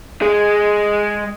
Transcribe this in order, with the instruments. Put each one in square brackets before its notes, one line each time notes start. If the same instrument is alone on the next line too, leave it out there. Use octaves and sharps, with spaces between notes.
[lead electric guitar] G#3 G#4